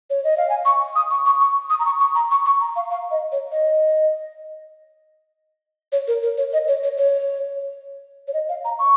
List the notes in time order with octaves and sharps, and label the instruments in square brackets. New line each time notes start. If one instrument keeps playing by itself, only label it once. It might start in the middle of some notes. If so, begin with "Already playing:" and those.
[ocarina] C#5
D#5
F5
G#5
C#6
D#6
C#6
C#6
C#6
D#6
A#5
C#6
C#6
A#5
C#6
C#6
A#5
F5
F5
D#5
C#5
D#5
C#5
A#4
A#4
C#5
D#5
C#5
C#5
C#5
C#5
D#5
F5
A#5
C#6